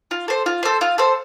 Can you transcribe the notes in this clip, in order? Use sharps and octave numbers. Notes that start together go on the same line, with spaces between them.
F4
A4 C5
F4
A4 C5
F4
A4 C5